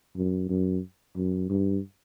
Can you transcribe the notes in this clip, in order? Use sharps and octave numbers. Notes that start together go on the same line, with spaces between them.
F#2
F#2
F#2
G2